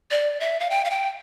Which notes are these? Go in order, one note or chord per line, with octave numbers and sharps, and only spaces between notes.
D5
E5
F5
G5
F5
G5